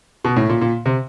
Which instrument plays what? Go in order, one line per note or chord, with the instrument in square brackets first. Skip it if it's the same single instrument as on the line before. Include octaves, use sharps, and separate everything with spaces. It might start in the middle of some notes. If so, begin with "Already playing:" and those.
[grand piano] B2
A2
A#2
A#2
C3